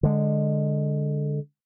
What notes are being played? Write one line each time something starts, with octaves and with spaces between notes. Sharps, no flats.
D3 G#3